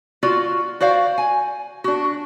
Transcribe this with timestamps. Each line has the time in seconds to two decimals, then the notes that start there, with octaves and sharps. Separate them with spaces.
0.23 F4 F#4 D5
0.81 F#4 C5 D5 F5
1.18 G#5
1.84 D4 F#4